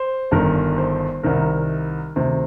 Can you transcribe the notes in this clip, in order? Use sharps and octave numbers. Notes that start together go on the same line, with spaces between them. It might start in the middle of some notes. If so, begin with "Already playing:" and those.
Already playing: C5
G1 G2 D#3 A#4
C5
C2 C3 D#3 A#4
D2 C3 D#3 C5